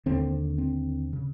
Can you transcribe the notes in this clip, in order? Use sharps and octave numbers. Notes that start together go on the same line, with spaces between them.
D#2 D3 C4
C4
C#3